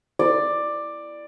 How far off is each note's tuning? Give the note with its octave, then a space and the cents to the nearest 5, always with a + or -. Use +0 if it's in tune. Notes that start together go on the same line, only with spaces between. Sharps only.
D5 +10